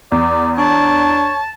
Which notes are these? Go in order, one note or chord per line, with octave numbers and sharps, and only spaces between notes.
E2 D5
D4 C#5 A5